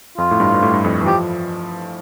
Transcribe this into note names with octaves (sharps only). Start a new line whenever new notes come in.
F2 F4
A2
G2
G2
A2
G2
F2
E3
F3 G4